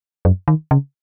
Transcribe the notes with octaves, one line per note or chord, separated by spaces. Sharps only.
F#2
D#3
C#3